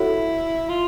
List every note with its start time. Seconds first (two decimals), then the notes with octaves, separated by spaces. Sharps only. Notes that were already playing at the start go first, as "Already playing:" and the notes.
Already playing: E4 F#4 A4 C#5 F#5
0.69 F4